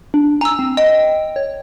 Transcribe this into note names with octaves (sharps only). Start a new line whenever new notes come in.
D4
G#5 A#5 E6
C4
D#5 G5
C#5